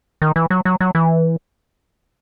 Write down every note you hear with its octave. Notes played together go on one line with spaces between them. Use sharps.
D#3
E3
F#3
F#3
F#3
E3